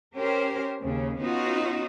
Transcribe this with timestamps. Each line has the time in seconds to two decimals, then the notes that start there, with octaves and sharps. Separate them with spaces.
0.15 C#4 G4 A#4 C5
0.80 D#2 C#3
1.19 B3 C#4 D#4 F4 F#4